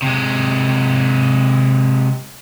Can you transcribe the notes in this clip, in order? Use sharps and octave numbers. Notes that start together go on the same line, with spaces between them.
C3 G#3